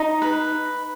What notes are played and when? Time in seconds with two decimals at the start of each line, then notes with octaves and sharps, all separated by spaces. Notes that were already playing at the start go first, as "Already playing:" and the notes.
Already playing: D#4
0.22 B4